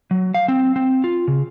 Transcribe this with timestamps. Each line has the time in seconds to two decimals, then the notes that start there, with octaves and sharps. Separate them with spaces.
0.11 F#3
0.34 F5
0.48 C4
0.76 C4
1.04 F4
1.28 C#3